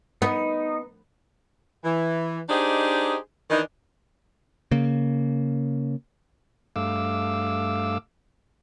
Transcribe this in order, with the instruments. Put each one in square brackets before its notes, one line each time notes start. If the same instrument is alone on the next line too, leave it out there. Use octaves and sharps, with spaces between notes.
[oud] B3 [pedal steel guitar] D#4
[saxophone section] E3
D4 D#4 G4 G#4 C5 D#5
D#3 E3 D4 D#4
[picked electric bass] C#3 A#3
[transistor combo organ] G2 A3 F5 D6 E6